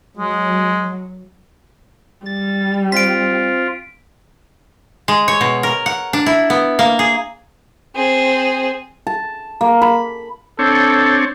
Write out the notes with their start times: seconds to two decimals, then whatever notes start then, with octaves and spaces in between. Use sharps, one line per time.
0.17 F#3 G#3
2.25 G3 A6
2.92 C4 F4 B6 D7
5.08 G#3
5.28 C#5
5.41 B2
5.63 A#4
5.86 F#5
6.13 D4
6.26 E4
6.50 B3
6.79 A#3
6.99 G#4
7.96 C4 G#4
9.07 A5
9.61 A#3
9.82 B5
10.59 C4 D4 A4 C#5